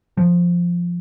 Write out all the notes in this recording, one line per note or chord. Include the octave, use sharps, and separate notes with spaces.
F3